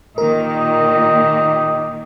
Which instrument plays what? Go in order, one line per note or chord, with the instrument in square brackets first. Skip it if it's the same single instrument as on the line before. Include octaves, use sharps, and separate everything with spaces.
[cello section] A#2 D#3 [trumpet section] G4 D#5 [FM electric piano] A#4